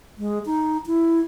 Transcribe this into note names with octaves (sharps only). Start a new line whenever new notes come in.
G#3
D#4
E4